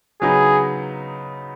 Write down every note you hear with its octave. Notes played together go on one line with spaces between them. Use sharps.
C#3 F#3 B3 D#4 F#4 G#4